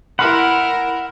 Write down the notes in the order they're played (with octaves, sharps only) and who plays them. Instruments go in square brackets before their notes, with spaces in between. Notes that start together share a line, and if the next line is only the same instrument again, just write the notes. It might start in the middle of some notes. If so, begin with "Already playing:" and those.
[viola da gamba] E4 A#4 [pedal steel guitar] F#5 [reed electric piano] B5 C6 F6